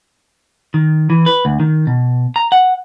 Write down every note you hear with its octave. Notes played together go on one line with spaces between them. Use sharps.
D#3
E3
B4
D2
D#3
B2
A#5
F#5